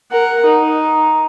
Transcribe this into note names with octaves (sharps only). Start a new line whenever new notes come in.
A#4 F#5
D#4